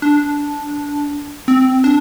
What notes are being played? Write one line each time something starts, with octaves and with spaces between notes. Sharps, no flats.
D4
C4
D4